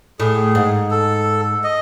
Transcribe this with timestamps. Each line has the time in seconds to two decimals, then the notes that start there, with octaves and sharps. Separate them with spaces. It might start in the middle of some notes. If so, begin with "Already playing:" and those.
0.19 A2 G#4
0.55 G#2
0.91 A4
1.63 D#5